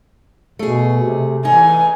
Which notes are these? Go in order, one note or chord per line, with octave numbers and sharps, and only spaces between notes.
B2 A3 G#4
C3
E3 D#4 G#5